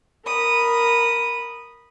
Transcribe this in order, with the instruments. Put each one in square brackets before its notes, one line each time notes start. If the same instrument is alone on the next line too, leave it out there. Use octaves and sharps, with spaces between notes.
[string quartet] A#4 B5 D#6